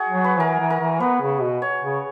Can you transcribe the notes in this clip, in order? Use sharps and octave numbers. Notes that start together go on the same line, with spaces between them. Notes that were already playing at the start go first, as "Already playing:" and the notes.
Already playing: F#4 G#4
F#3
B4
E3 A#4
E3
A#4
E3
B3 B4
C#3
B2
C#5
C#3